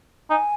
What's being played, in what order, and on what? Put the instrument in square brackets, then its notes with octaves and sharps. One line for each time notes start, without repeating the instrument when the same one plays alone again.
[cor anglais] D#4 [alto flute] G#5